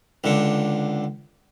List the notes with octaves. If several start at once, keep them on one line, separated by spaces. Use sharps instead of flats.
C#2 D3